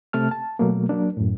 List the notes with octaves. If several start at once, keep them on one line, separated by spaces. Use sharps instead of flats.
C3 A3 A5 F6
A5
B2 F#3 A3 A#3
F#3 A#3 D4
F#2 A2